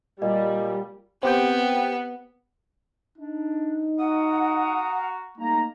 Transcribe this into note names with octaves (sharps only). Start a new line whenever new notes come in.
A#2 G3 D#5
B3 C4 G4 G5
D4 D#4
F#4 F5 F#5 A#5 D#6
G3 A3 A#3 D#4 A#5